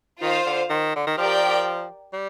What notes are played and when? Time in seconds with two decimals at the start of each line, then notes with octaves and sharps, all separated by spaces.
0.21 D#3 F4 C5 F5
0.45 D3
0.70 D#3
0.96 D3
1.06 D#3
1.17 F3 G4 A#4 D5 G5
2.13 G3